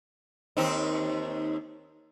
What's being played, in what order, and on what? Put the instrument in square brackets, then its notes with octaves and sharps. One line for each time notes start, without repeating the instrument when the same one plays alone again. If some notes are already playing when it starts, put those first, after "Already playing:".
[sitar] D#2 C4 D#4